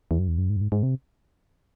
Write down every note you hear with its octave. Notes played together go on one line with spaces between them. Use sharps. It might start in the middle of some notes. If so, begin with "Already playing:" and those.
E2
F#2
E2
F#2
G#2
F#2
G#2
G#2
C3